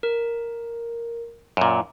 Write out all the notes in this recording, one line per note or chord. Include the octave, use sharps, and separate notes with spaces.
A#4
F#2 A#2